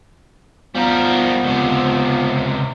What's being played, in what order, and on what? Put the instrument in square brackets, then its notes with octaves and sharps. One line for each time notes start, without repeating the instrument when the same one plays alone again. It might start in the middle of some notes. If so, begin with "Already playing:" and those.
[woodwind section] F3 B3 [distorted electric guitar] G3 A#4
[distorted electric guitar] C#2 C3